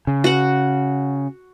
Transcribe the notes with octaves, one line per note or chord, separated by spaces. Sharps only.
C#3
F#4 F#5